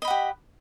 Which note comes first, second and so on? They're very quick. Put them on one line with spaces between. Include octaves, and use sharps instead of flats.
D#5 B5 F#5 G4